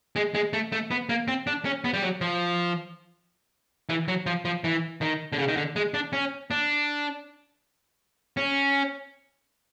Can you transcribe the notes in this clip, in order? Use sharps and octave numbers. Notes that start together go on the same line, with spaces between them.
G#3
G#3
A3
A3
B3
A#3
C4
D4
C#4
B3
G3
F#3
F3
E3
F#3
F3
F3
E3
D#3
D3
C#3
D#3
D3
G#3
D4
C#4
D4
C#4